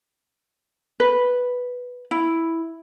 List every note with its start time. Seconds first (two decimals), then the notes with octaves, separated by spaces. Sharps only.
1.00 B4
2.11 E4